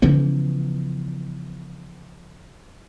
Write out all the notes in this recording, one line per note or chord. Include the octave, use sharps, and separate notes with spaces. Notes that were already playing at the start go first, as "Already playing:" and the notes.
C#3 E3 F3 B3